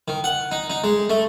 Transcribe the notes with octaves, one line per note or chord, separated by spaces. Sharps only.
D#3
F#5
D#4
D#4
G#3
A3